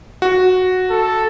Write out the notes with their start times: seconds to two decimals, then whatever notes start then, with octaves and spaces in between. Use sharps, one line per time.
0.22 F#4
0.90 A4